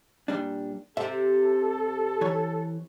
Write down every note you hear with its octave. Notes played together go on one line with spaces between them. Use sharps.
A#2 G3 D4
C3 A4 E5
E3 C#5